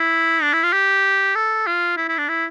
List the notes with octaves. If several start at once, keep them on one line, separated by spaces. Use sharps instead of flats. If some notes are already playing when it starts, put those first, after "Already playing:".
Already playing: E4
D4
E4
F4
G4
A4
F4
E4
E4
D4
E4